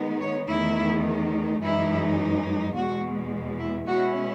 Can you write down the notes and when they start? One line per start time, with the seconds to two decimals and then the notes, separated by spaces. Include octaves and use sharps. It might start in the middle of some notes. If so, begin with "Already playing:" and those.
Already playing: D#3 G#3 B3 D#4
0.21 C#5
0.48 E2 D#3 A3 D#4 E4
1.62 F#2 E3 G#3 D#4 E4
2.75 E2 B2 G#3 F#4
3.59 E4
3.88 B2 G#3 C#4 E4 F#4